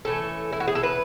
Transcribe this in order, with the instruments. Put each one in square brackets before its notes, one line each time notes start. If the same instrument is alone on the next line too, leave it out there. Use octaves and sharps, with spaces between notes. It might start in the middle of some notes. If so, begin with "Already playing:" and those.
[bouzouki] E3 A3 C#4 A4
E4
F#4
G#4
A4
B4